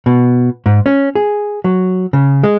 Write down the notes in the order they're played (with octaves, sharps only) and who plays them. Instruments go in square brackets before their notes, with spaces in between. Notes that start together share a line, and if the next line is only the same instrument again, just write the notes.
[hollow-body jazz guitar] B2
G#2
C#4
G#4
F#3
C#3
G#3